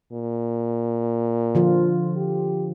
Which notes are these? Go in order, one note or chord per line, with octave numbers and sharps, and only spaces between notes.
A#2
D3 F3 F4
G4